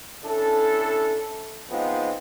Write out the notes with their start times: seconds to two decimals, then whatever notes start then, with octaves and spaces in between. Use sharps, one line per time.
0.24 C#4 D4 E4 A4
1.70 F3 G#3 B3 C4 D#4 F4